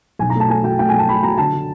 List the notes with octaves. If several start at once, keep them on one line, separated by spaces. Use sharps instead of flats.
B1 G#5
A#5
A3
A5
A3 G#5
F#3 G5
A3 G5
G#5
F#3
A5
F#3 B5
F#3 A#5
D3 A5
D3